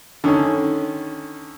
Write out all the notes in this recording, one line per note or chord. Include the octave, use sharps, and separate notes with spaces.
D3 D#3 C#4